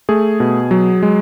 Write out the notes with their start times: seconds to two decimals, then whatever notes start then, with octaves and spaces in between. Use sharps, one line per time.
0.09 A3 G#4
0.40 B2
0.71 F#3
1.03 G#3